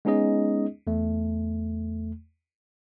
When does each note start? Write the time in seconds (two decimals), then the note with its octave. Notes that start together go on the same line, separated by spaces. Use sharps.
0.05 G#3 B3 C#4 D#4 G#4 D#5
0.87 E2 A3